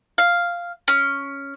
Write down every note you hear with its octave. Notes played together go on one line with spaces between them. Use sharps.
F5
C#4